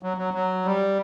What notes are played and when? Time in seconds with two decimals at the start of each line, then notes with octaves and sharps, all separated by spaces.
0.03 F#3
0.17 F#3
0.34 F#3
0.65 G3